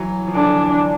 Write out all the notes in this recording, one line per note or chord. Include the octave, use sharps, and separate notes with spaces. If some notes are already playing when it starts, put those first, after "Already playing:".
Already playing: E3 F#3
F3
D3 E3 D4